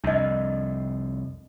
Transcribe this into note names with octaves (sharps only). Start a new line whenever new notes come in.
C2 F2 D4 D#5